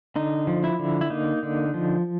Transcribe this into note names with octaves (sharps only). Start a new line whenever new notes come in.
D3 D#4
F3
E4
D3
E4
A#3 D#4
D3
F3